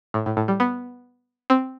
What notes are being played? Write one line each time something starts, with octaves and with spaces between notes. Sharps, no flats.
A2
A2
A2
G3
B3
C4